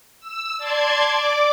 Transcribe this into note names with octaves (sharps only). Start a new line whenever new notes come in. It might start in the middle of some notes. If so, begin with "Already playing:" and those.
E6
D5 A5 C6 G#6
D5 D6